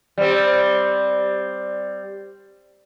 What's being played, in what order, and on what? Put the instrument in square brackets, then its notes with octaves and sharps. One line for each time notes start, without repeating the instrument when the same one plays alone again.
[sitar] G3 C4